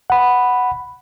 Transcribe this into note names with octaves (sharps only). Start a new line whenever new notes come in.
F#5 B5